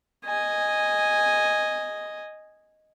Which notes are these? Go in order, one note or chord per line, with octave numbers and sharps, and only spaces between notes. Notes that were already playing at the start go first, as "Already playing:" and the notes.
D#5 G#5